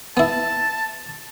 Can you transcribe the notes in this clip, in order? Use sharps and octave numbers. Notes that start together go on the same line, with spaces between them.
B3 E4 A5